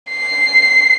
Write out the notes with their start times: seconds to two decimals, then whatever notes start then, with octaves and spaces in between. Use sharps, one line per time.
0.11 C7